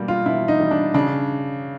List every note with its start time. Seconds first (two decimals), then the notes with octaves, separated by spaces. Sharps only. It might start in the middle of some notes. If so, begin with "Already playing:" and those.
Already playing: B2 G3 A#3
0.08 F4
0.26 B2 E4
0.48 D#4
0.60 G3
0.71 D4
0.94 C#3 D4